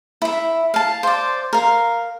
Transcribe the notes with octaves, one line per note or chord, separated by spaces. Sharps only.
E4 E5
F5 A5
C5 D5
A#4 F5